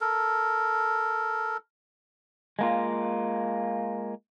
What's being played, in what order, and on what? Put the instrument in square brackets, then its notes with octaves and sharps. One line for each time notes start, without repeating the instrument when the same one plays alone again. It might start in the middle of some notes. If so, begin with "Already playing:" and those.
[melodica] A4 A#4
[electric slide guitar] G#3 A#3 F4